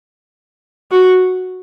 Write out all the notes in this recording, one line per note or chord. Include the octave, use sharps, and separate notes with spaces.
F#4